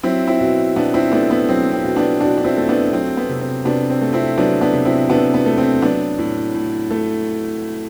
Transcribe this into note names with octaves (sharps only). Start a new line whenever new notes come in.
F#3 C4 E4
C4 E4
B2
B2 B3 D4
C4 E4
A3 B3 D4
B3
F#3 C4
C4
B2
B3 D4
B2 D4 F#4
D4
C4 E4
A3
B3 D4
F#3 C4
B3
C3
C4
C3 B3 D4
C4
A3
C4 E4
F#3 B3 D4
B3 D4
C3
C4 E4
C3 B3 D4
B3
A3
C4
F#3 B3 D4
A2
A2
A3